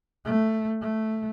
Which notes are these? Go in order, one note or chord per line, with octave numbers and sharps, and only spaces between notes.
A3
A3